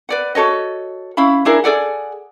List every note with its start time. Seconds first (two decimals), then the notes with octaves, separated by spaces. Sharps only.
0.09 B4 D5 F#5
0.35 F#4 A4 C#5 D#5
1.17 C#4 E4 F5 B5
1.45 D4 E4 G#4 A#4
1.64 G#4 A4 D5 F#5